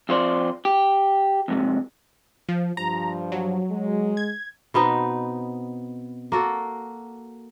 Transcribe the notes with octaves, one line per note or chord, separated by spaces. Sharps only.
F2 F4 C5 D5
G4
F2 G#2 C3
F3
G2 F3 A#5
F#3
G#3
G#6
B2 B3 C4 D#4
A#3 F#4 A4